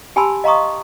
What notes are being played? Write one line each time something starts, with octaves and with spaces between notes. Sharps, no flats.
G4 G#5 A5 B5 C6 E6
D#5 F5 A#5 C6 C#6 D#6